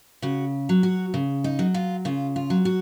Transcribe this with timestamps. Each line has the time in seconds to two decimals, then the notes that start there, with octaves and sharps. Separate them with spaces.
0.22 C#3 F#4
0.69 F#3
0.83 F#4
1.14 C#3
1.44 D#4
1.59 F#3
1.74 F4
2.05 C#3 F4
2.36 F4
2.50 F#3
2.65 F#4